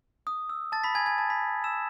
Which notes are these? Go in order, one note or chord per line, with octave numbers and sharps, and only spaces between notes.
D#6
E6
A5 A6
B5 B6
G#5 G#6
G#5 G#6
A5 A6
B5 B6
E6 E7